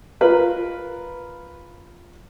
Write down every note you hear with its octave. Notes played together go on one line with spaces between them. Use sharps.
F4 A#4 B4 B5